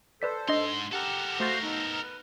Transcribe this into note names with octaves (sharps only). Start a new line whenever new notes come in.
A4 B4 C5 D5 B6
G#2 D4 D#5 C6
G4 A4 A#4 F#5
A3 F#4 C5 F5 A6
B3 D#4
B4